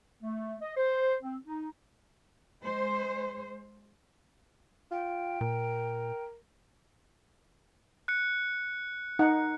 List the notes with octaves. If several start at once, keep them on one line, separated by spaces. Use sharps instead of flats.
A3
D#5
C5
C4
D#4
G#3 C5
F4 G5
A#2 A#4
F#6 C#7
D#4 F#5